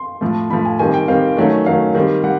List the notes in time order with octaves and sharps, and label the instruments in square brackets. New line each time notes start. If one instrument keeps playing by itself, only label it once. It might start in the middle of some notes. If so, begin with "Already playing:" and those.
Already playing: [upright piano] C6
A2 F3 A3
A2 F3 A3 B5
G#5
D#3 G3 C4 G#5
G5
D#3 G3 C4 F5
D#3 F#3 A3 C#4
D#3 F#3 A3 C#4 F5
D#3 G3 C4
G3 F#5